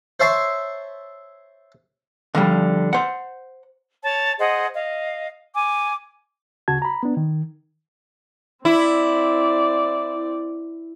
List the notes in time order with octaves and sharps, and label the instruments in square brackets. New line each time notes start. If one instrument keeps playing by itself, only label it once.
[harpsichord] C5 C#5 E5 A5 C6
[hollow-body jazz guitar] D3 F3 G3
C5 F#5
[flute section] C#5 A5
G#4 C5 D#5 F#5
D#5 F5
G#5 D6
[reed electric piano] D2 C#3 F#4 A5 G#6
A#5 B5
B3 D4
D#3
[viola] C4 D5 [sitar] E4